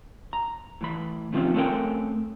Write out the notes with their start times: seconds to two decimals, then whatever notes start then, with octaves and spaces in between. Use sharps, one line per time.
0.33 A#5
0.81 A2 E3 B5
1.33 C3 D#3 F3 A#3 C4 C#4
1.54 A3 C4 C#4 A4 A#4 G5